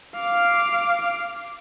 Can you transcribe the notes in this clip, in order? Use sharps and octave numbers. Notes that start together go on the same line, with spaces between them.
F5 D6